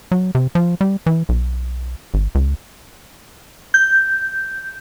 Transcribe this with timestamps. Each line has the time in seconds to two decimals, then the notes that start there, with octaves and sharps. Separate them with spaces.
0.12 F#3
0.35 C3
0.55 F3
0.81 G3
1.06 E3
1.29 B1
2.14 G#1
2.35 C#2
3.74 G6